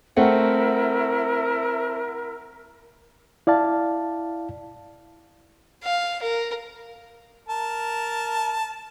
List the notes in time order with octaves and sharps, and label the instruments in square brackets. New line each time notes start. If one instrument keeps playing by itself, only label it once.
[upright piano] A3 C4 F#5 [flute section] E4 A#4
[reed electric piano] E4 D5 F5 A5
[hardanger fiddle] F5
A#4
[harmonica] A#4 A5